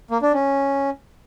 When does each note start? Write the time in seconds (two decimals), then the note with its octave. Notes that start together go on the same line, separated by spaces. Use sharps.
0.11 A#3
0.22 D4
0.34 C#4